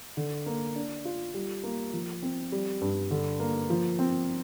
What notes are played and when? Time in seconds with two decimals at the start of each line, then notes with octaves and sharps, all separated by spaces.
0.17 D3
0.46 A#3
0.76 D4
1.05 F4
1.34 G3
1.64 A#3
1.93 F3
2.22 C4
2.52 G3
2.81 G2
3.11 D3
3.40 A#3
3.70 F3
3.99 C4